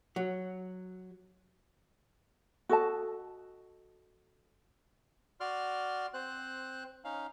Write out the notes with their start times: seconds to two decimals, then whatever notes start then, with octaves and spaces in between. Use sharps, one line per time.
0.16 F#3
2.69 F#4 A4 D#5 A5
5.40 F#4 D5 C6 F6
6.14 C4 C5 F#6
7.04 C#4 D#4 F5